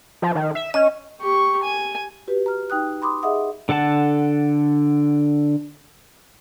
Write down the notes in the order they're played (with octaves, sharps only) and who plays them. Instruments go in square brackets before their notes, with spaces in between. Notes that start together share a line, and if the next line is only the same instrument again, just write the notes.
[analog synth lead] F3
D#3
E5
[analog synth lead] C#4 [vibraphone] D#5
[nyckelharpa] G4 C#6
G#5
[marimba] F#4 G4 B4
A#5 F6
D#4 G5 D#6 F#6
B5 C6 D6 D#6
G#4 D#5 E5 F#5 D#6
[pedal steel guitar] D3 A4 F#5 A5